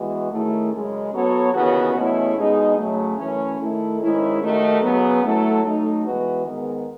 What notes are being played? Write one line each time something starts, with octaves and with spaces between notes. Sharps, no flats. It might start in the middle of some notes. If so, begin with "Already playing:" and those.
Already playing: E3 G#3 B3 F#4
D#3 A3 C#4 E4 G#4
F#2 C#3 G#3
F#3 B3 F#4 A4 C#5
D#2 C#3 E3 B3 F#4
E2 B2 A3 C#4 E4
B2 G#3 D#4 G#4
C#3 F#3 A3
F#2 E3 A3 C#4
D#3 A3 E4 A4
G#2 D#3 G#3 C#4 E4
D#2 D#3 A3 D#4 F#4
C#3 F#3 B3
F#3 A3 E4 A4
F#3 A3 D#4
E3 G#3 B3 F#4 B4
G#2 D#3 G#3 B3